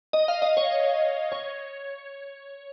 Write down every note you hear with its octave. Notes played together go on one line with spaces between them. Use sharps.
D#5
F5
D#5
C#5
C#5